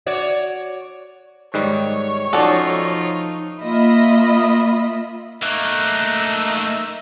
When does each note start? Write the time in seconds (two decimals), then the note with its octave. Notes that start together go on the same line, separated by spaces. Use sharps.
0.06 F#4 C#5 D5
1.54 G#2 D#3 G3 C#5
2.33 F3 C#4 D#4 F4 F#4 A4 D5
3.61 A#3 F4 D#5 E5 B5
5.42 A3 A#3 D#4 E5 F#6